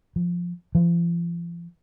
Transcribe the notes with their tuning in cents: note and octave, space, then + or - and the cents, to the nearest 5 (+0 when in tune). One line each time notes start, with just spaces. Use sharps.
F3 +5
F3 -40